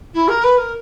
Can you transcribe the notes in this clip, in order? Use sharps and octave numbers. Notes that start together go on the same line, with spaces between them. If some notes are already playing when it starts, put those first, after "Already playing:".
E4
A#4
B4
A#4